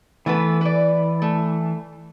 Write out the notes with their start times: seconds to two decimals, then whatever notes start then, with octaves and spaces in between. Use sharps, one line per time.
0.26 E3 A3 B3 B4
0.61 B4 D5
1.22 A3